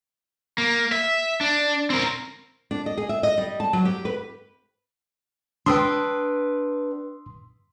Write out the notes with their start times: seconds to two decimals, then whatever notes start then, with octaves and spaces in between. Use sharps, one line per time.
0.58 A#3
0.92 E5
1.41 D4
1.90 C4 A#4
2.71 D4
2.86 D#5
2.97 G#4
3.09 E5
3.23 D#5
3.38 G3
3.60 A5
3.73 F#3
3.85 G4
4.05 B4
5.66 D4 B4 G5 C6 D#6 E6